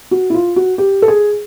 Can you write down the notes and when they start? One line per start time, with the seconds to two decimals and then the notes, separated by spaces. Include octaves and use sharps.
0.11 F#4
0.30 E4
0.34 F4
0.56 F#4
0.78 G4
1.02 A4
1.08 G#4